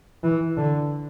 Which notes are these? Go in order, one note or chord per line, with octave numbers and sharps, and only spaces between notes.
E3
D3